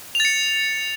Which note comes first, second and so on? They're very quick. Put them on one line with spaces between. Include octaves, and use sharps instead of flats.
F7 A6 C#7